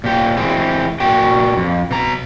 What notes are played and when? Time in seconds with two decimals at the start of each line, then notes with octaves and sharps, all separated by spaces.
0.04 A#2 G4
0.37 E3 G#3 C4
1.00 A#2 F#4 G5
1.57 F2
1.91 B2 A#5